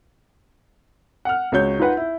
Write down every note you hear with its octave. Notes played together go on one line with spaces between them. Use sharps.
F#5 F6
C#2 F#4 C#5 G6
D#4 F4 B4 F#5
E4